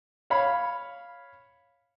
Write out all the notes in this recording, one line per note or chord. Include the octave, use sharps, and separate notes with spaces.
C#5 F5 B5